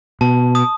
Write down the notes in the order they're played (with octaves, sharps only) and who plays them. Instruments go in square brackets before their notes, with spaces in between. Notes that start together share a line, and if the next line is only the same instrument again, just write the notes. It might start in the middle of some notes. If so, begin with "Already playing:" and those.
[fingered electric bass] B2 [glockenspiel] A5
[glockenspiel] D#6